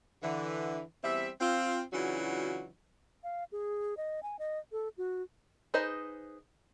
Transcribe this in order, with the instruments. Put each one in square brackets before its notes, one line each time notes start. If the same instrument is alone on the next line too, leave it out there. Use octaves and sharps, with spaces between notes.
[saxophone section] D3 E3
E2 G3 C4 E5
C4 F4
C#3 E3 F#3 D4 F4 F#4
[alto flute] F5
G#4
D#5
G#5
D#5
A4
F#4
[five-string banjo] D#4 G#4 B4 C5 D#5